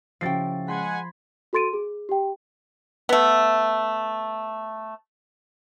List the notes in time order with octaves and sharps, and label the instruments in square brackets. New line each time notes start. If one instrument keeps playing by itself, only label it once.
[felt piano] C#3 A6 C7 [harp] F3 [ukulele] E4 F#4 G5
[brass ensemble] G#3 F#5 G#5 [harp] B5 C6 G#6
[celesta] F#4 A4 C6 A6 D7 D#7
G#4
G4 G5
[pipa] A3 B3